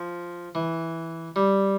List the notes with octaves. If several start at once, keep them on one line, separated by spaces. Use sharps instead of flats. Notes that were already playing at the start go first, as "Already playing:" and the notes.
Already playing: F3
E3
G3